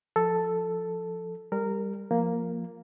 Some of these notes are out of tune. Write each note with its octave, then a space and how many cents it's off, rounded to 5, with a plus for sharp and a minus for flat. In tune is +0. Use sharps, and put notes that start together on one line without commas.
F3 +0 A4 +0
G3 +20 A#4 -15
F3 +0 A#3 +0